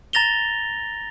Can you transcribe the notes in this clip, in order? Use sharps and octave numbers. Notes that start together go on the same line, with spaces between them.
A#5 A6 A#6 F7 G7